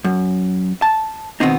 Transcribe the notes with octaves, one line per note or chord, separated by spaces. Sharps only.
F#2
A5
B2 D#3 B3 C4 D#4